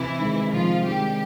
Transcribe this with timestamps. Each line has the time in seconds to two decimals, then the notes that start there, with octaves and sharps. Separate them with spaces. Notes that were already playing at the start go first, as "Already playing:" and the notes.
Already playing: C3 E3 E4
0.19 D#3 G#3
0.52 C3 F3 F4
0.85 D#3 G3 G#3 G4